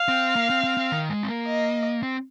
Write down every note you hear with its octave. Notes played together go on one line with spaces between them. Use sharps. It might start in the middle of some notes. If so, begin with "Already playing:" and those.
Already playing: F5
C4
A#3
C4
C4
C4
D#3
G#3
C4
A#3
D#5
C4